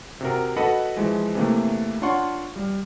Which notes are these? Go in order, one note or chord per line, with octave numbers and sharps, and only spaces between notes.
C3 F#4 A#4
F#4 A4 B4 D#5 F#5 B5
E3 F3 G#3
C3 E3 A3 A#3
D4 F4 C#5 F#5 C6 C#6
G3